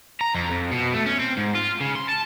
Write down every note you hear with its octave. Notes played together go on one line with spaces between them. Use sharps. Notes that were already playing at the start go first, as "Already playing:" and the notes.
A#5
F2
F2
B2
A3
C#4
C4
G#2
F4
C#3
C6
A5